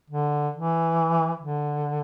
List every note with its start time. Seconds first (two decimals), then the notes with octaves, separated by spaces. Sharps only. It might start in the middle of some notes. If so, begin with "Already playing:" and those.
0.11 D3
0.54 E3
1.40 D3